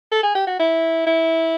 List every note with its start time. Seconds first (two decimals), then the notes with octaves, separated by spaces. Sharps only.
0.12 A4
0.23 G#4
0.35 G4
0.47 F#4
0.59 E4
1.06 E4